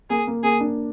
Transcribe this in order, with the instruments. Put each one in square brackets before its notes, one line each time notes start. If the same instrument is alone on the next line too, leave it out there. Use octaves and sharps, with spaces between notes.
[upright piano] A#3 [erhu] G#4
[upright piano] A#3
[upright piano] A#3 [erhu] G#4
[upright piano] D4